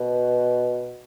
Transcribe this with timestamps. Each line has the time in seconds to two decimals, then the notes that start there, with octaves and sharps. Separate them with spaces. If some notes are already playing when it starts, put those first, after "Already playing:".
Already playing: B2